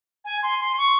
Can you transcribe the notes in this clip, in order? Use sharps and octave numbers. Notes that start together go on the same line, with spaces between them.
G#5
C6
C6
C#6